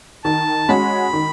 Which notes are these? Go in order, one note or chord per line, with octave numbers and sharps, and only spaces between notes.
D#3 A5
G#3 C#4 F#4 B5
D#3